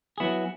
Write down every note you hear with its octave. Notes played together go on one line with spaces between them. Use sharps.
F#3 B3 E4 G#4